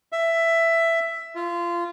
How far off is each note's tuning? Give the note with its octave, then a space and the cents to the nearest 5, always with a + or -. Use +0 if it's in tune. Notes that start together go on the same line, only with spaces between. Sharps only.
E5 +10
F4 -20